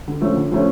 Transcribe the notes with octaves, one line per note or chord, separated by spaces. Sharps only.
D3
F3 A3 C#4
D3
F3 A3 C#4